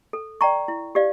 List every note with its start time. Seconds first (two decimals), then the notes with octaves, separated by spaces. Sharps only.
0.13 A4
0.41 D5 G5 A#5 C#6
0.68 E4
0.95 G4 D5 F5